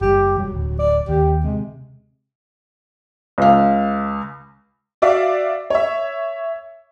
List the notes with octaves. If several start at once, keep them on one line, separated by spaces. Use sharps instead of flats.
F#1 G3 G4
E1 F#3 G3
D1
D5
D#2 G4
C3 G#3
C#2 F5
F#4 D5 E5 F5
C#5 E5